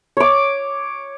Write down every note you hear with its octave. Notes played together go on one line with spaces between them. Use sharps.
C#5 D6